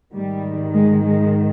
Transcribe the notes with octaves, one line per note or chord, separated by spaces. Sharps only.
G#2 D#3 G3
G#3
G#3